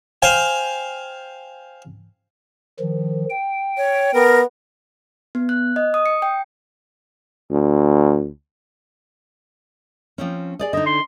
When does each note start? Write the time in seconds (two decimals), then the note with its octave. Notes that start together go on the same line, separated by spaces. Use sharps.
0.22 C5 F5 G5 G#5
2.80 D#3 F3
3.30 G5
3.77 C#5
4.14 B3 A#4
5.35 B3
5.49 F#6
5.76 D#5
5.94 D#6
6.06 C#7
6.22 G5
7.51 D2
10.18 F3 C4 C#4
10.59 G#4 D5 D#5
10.73 D3 D#4 D#5
10.86 C6